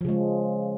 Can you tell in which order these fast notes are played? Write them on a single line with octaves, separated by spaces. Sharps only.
F3 C#3 G#3